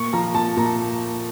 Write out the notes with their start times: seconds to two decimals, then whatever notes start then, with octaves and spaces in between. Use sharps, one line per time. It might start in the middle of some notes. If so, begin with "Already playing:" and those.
Already playing: A#2 C#6
0.13 F3 A#5
0.34 A#2 A5
0.57 A#2 A#5